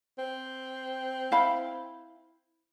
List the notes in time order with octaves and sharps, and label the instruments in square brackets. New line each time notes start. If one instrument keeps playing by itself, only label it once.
[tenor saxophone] C4
[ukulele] E4 F5 B5